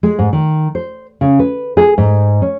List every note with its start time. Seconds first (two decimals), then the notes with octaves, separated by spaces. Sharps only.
0.03 G#3
0.19 G#2
0.33 D#3
0.75 C5
1.21 C#3
1.39 B4
1.77 G#4
1.98 G#2
2.42 C#4